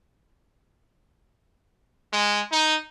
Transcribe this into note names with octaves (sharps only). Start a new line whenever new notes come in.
G#3
D#4